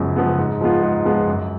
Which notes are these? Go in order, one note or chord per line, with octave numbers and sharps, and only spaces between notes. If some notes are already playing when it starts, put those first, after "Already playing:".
Already playing: F#2 C#3 F3 G#3 B3
C#3 F3 G#3 B3
G#2
F3 G#3 B3 F4
G#2
F3 G#3 B3 F4
F#2